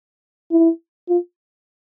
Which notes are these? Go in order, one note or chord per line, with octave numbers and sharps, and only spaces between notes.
E4
F4